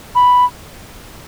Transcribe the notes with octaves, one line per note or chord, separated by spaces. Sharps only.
B5